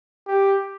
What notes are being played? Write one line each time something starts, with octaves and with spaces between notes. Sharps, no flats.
G4